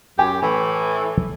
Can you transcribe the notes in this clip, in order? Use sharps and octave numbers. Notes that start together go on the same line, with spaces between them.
F#2 G4 G5 G#5
A2 E3